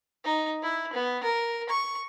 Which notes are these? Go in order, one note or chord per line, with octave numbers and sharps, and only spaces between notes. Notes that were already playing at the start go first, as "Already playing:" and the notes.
D#4
E4
B3
A#4
C#6